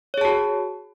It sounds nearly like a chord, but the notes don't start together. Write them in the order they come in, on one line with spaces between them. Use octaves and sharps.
C#5 G#4 A5 F#4